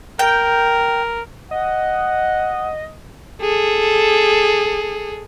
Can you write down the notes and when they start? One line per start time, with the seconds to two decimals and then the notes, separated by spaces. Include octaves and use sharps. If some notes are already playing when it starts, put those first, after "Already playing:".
0.19 A#4 G5
1.51 D#5 F#5
3.41 G#4 A4